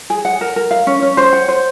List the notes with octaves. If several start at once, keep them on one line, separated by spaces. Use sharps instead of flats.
G#4
F#5
A#4
A#4
F5
C#4
C#4
C5
F#5
C5